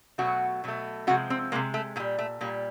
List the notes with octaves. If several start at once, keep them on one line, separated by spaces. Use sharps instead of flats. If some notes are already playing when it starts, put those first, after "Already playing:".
B2 F#3 A3 F#4
B2 F#3 A3
C3 F3 G#3 F#4
C4
C3 F3 G#3 A#3
A3
A#2 G3 A#3
A3
A#2 G3 A#3